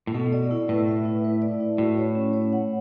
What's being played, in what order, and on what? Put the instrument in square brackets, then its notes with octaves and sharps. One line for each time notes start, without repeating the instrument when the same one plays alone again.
[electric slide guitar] A2
[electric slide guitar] B2 [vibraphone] A4
[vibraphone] D5
E4
[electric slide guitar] A2 [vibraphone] B4
[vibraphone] E5
E4
B4
D5
E4
[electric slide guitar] A2 [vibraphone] F#4
[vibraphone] C#5
C#4
C#5
F#5